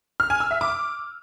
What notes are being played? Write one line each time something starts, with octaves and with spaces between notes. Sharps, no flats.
F6
G#5
E6
E5
D6